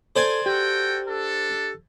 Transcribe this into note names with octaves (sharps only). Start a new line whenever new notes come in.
A4 C5 D5 G#5
F#4 G4 A4 G5
D4 A4